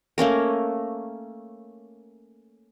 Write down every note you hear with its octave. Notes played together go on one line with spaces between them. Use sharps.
A3 A#3 C#4 A#4